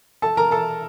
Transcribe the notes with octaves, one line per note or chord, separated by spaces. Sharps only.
A4 A5
A#4 A#5
A4 A5